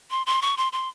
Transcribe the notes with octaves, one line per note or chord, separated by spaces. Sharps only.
C6
C6
C#6
C6
C6